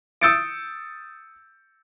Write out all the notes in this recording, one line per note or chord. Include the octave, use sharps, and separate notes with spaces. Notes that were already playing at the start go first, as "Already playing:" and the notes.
D#6 E6 G6 A6 C#7 D7